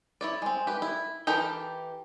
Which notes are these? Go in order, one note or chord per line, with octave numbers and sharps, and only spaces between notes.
E4 C#5 D5
G#3 C4
G4 B4
E4
E3 G4 A4 A#4 G5